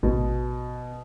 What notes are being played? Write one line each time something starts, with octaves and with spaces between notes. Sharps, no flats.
A1 B2